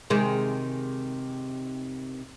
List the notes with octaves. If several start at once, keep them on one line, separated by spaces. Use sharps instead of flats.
C3 D#3 G#3